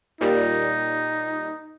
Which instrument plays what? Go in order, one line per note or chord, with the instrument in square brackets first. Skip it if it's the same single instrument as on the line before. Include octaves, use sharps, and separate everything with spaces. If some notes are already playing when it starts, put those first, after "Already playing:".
[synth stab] A#2 G3 [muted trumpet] D#4